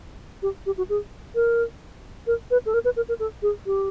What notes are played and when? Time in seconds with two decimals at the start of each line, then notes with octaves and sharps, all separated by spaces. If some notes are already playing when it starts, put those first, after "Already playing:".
0.42 G4
0.66 G4
0.77 F#4
0.89 G#4
1.35 A#4
2.27 A#4
2.51 B4
2.66 A4
2.74 A#4
2.85 B4
2.96 A#4
3.09 A#4
3.20 A4
3.42 G#4
3.66 G4